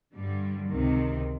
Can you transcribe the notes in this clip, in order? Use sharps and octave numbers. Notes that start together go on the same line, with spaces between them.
G2 D3 G3
C#2 C3 D#3